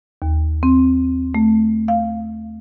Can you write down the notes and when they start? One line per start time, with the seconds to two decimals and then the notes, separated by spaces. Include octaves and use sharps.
0.22 D#2
0.63 C4
1.35 A3
1.88 F5